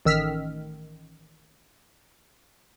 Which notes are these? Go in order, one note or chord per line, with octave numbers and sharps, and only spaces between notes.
A1 D#3 E6 F6 B6